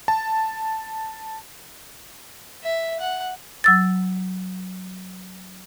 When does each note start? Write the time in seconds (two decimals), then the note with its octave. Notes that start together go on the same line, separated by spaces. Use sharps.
0.08 A5
2.63 E5
3.00 F#5
3.64 F#3 E6 A6